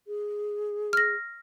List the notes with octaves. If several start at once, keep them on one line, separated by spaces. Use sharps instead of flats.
G#4
F6 A#6